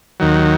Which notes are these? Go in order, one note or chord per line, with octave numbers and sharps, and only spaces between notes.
D#2 D#3 F#3